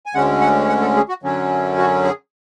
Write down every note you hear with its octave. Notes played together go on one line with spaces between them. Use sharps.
G#5
D2 D3 G#3 C#4 F#5
F#5
F#5
A4
G#4
F#4
F#2 D3 F#3 C#4
F#4
G#4